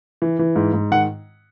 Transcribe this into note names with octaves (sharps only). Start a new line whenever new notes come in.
E3
E3
G#2
G#2
D#3 F#5